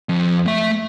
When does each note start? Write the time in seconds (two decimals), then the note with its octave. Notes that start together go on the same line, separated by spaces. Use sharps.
0.09 F2
0.46 A3 E5